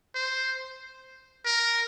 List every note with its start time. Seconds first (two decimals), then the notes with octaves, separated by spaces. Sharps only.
0.15 C5
1.46 A#4